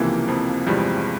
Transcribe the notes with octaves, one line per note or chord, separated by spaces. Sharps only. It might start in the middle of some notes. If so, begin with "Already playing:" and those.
Already playing: C#2 C3 E3 F3 A#3
F2 F3
E2 G2 C3 F3 G3 G#3